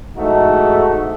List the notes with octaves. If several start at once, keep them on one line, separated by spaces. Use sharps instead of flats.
E2 G#2 A3 D#4 F#4